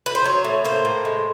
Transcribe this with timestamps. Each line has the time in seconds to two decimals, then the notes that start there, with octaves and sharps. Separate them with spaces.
0.06 B4
0.15 C5
0.24 F#3 C#5
0.44 A2
0.65 A#3 C5
0.85 A2
1.05 G#3